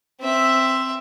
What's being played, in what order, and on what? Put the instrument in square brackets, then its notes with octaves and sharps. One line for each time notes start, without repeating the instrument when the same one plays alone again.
[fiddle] C4 E5